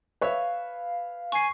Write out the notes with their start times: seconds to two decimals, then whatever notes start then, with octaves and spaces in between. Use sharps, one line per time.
0.21 B4 C#5 E5 F5
1.32 G#5 C#6 C7